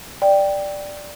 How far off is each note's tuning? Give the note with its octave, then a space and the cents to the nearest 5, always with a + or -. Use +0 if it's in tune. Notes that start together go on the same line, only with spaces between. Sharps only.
D5 +0 G5 +0